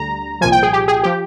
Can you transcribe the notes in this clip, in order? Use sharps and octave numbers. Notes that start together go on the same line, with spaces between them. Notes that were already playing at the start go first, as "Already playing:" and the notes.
Already playing: D2 D3 G3 A#5
C2 A#2 F3 G#5
G5
G#4
G4
G#4
F3 G4